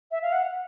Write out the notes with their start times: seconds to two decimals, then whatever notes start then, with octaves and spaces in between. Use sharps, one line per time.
0.11 E5
0.22 F5
0.32 F#5